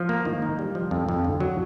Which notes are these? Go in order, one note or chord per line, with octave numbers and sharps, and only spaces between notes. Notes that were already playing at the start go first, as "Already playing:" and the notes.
Already playing: F3
A#3
D#3
D#4
G3
F3
F2
F2
D3
F#3